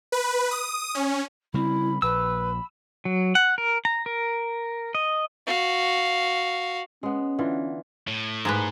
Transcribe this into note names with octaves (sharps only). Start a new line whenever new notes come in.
B4
D#6
C#4
C#3 G3 C4 E4 B5
A#1 B4 B5 E6
F#3
F#5
A#4
A#5
A#4
D#5
F#4 F5
G#3 B3 C#4
D3 E3 F4
A2
G#2 G#4 B4